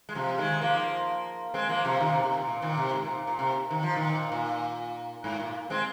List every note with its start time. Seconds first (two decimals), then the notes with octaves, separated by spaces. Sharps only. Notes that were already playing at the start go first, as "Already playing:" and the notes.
0.09 G#3
0.15 C3 F3
0.38 D#3 G#3
0.61 F3 A#3
1.54 G#3 C4
1.69 F3 A#3
1.84 C3 F3
2.00 A#2 D#3
2.12 C3
2.23 C3
2.34 A#2
2.47 A#2
2.62 A#2 D#3
2.77 C3
2.93 G#2
3.05 A#2
3.27 A#2
3.39 C3
3.70 D#3
3.83 F3
3.96 A#2 D#3
4.32 A#2
5.24 G#2
5.39 A#2
5.70 G#3 C4